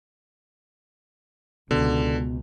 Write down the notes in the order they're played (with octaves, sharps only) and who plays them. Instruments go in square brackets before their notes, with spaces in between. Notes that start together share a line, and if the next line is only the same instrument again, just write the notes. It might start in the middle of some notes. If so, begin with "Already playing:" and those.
[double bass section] C#2 [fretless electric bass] B2 [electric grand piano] D3